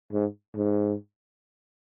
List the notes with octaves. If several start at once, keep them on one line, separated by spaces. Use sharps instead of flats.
G#2
G#2